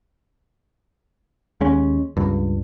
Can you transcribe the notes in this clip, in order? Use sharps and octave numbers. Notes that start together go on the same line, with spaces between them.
D#2 G#3 C#4
C#2 G2